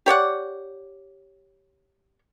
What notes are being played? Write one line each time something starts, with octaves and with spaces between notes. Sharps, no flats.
G4 C#5 D5 F#5